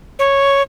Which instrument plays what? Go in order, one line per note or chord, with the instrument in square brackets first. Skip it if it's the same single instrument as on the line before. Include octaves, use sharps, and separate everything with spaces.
[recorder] C#5